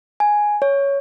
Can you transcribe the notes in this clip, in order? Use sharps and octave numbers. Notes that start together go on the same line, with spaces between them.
G#5
C#5